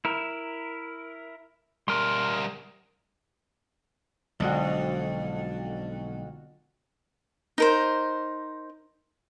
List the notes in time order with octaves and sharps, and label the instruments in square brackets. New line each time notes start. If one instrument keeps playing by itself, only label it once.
[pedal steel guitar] E4 A#4
[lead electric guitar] G3 A#4 [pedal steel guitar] C6 F6
[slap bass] B1 G#3 [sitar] F2 [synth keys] D3 F#4
[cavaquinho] D#4 A#4 C5